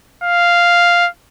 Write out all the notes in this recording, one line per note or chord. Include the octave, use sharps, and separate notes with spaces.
F5